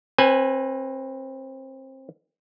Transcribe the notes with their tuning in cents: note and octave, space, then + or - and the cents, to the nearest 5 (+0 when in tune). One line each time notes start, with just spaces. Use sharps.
C4 +25 B4 +0 G#5 +0